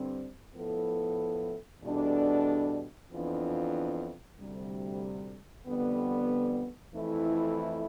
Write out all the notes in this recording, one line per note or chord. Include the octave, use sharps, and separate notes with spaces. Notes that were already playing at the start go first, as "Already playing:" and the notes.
Already playing: G2 D3 G3 C4
A2 F3 B3 E4 A4
E2 B2 G3 D4 A4
F2 E3 B3 D4 F4
D2 C3 G3
F2 D3 G3 B3
F2 E3 A3 E4